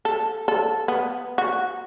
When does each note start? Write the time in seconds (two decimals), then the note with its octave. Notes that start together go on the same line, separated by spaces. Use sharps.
0.05 A4
0.48 A4
0.88 B3
1.38 F#4